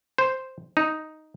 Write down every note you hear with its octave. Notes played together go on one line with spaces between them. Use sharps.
C5
D#4